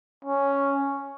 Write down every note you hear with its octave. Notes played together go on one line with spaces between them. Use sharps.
C#4